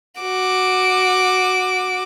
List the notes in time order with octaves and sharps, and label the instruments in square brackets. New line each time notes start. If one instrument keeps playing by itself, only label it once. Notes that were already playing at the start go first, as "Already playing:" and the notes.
[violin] F#4 D6